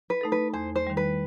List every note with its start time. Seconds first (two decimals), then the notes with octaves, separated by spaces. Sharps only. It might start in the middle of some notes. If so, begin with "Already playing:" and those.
0.10 B4
0.21 A3 D#4 A4
0.32 B4
0.54 E2 C5
0.76 C5
0.87 D#3 G3
0.97 B4